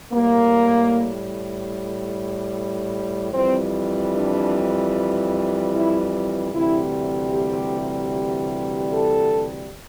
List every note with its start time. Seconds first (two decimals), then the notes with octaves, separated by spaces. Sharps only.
0.13 A2 G3 A#3
3.33 F2 E3 G3 C4
4.13 D4
5.72 E4
6.53 D2 C3 E3 G3 E4
7.32 G4
8.92 A4